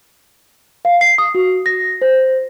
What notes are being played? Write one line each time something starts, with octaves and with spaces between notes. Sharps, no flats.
F5
C7
D#6
F#4
A#6
C5